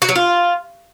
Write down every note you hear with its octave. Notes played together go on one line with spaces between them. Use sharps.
F#4
F#3
F4